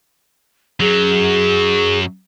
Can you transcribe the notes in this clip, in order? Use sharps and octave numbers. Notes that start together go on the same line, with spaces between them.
F#2 F#3 G#4